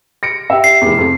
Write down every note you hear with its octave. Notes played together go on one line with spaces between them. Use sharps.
A#6 C#7 D7
G4 E5
C7
F1 E2
F2